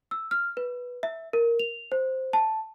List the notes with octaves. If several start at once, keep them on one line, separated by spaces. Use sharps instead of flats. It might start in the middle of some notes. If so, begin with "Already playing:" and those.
E6
F6
B4
E5
A#4
F7
C5
A5